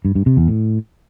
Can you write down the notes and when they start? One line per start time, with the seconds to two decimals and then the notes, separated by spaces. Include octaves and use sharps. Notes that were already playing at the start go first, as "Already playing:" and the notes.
0.05 G2
0.15 G2
0.26 C3
0.37 E2
0.48 A2